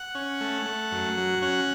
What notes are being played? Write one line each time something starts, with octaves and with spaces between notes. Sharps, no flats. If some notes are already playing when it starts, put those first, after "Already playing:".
Already playing: F#5
C#4
A3
A3
F#2
F#3
C#4 F#5